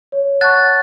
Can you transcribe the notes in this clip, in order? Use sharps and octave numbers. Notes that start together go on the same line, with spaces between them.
C#5
F#5 A5 C#6 F#6 A6